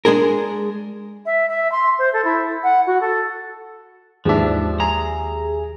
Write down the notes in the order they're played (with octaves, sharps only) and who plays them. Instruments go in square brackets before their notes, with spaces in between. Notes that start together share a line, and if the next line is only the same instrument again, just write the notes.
[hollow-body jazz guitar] G#3 D4 G#4 A#4
[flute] E5
E5
C6
C5
A4
E4
F#5
F#4
A4
[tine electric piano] D#2 G4 E5 [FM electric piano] G#2 E3 D4 [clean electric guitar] F3
[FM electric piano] G#4 [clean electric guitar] A#5